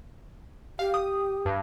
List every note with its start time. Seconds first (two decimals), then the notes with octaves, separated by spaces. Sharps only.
0.79 G4 F5
0.94 D#6
1.45 G2